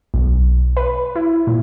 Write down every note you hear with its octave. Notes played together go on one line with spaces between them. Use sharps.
B1
B4
E4
A#2